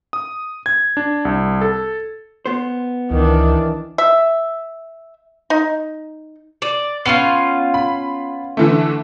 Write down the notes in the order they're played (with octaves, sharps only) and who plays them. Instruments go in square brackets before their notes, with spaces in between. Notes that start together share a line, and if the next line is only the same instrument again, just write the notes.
[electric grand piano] D#6
G#6
D4
C2
A4
[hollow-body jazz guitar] B3 C5
[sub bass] C#2 [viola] D#3 D4 [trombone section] E3
[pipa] E5
D#4
[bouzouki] D5
[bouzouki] B3 C#4 F4 [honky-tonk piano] C7
[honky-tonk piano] B5
D3 E3 A3